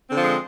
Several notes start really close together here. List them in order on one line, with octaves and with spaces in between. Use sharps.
C4 D3 F3 G#3